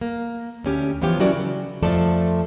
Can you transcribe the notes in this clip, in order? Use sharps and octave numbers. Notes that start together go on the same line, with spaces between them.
A#3
D2 C#4 G4
E3 F3 B3 F4 G4 C#5
F#3 C#4 E4 F#4 A#4 D5
C#3
F2 F3 A3 A4 D5 A5